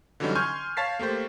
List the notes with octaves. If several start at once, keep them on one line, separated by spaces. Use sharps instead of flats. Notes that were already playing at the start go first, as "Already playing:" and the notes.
D3 E3 F#3 G3 C#4 D#4
G#5 C6 C#6 F6 G6 G#6
C#5 F5 A5 A6 B6 C7
A3 A#3 G4 C5